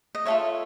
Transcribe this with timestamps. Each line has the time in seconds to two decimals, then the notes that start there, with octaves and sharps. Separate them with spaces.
0.15 D#5
0.25 F4 A4 C#5 E5